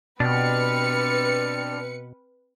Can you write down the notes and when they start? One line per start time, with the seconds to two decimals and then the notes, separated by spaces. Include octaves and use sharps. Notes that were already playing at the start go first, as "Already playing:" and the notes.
0.20 B2 C4 D4 G4 B4 F6 C#7